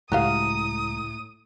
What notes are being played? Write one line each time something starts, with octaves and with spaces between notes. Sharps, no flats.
C#2 A2 F#4 G4 F5 A#5 D#6